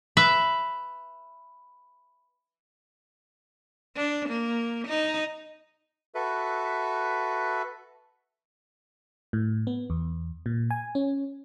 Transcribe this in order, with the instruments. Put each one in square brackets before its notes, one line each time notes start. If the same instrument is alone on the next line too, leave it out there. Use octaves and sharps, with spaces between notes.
[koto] B4 E5
[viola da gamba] D4
A#3
D#4
[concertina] F#4 A4 B4 E5
[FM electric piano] A2
B3
E2
A#2
G#5
C#4